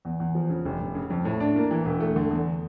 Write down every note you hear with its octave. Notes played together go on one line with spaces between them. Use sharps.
E2
E2
F3
C#3
F1
F1
C#3
F2
A2
D4
A#3
E3
E1
A3
D3
E2